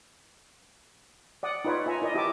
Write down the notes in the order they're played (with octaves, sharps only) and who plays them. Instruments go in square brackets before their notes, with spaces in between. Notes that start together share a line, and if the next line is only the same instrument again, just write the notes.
[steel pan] D5 F#5 D#6
D#4 F4 B4 C#5
F4 E5 G#5 A#5
E4 A#4 D5 D#5
E4 F#4 G4 E5 A5 D6